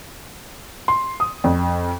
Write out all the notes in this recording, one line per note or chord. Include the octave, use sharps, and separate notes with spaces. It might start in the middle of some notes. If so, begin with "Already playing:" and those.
C6
D#6
F2